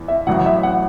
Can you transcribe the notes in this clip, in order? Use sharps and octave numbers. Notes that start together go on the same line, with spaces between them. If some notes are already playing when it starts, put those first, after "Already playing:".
Already playing: E2
E5
A1 A2 F#3 F#5
E5
F#5